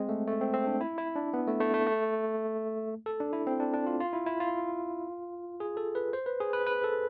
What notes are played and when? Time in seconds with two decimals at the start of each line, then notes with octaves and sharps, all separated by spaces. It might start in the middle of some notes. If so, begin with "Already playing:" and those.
Already playing: G#3 C4
0.09 A3
0.27 A3
0.41 C4
0.54 C4
0.67 D4
0.81 E4
0.98 E4
1.16 D4
1.34 B3
1.47 A3
1.60 A3
1.74 A3
1.87 A3
3.06 A4
3.20 D4
3.33 E4
3.47 C4
3.60 D4
3.74 D4
3.87 F4
4.00 F4
4.13 E4
4.26 E4
4.40 F4
5.60 G#4
5.77 A4
5.95 B4
6.13 C5
6.26 B4
6.40 G#4
6.53 B4
6.67 B4
6.84 A4